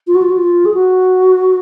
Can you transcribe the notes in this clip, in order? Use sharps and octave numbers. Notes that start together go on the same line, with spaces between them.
F4
F#4
F4
F#4
F4
G#4
F#4